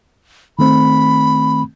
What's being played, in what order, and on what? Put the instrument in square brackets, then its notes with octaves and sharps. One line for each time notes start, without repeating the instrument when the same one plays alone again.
[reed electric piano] D#3 A3 C4 [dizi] B5